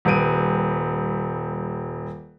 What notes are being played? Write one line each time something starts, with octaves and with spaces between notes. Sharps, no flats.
D#1 G3 B4 D7 D#7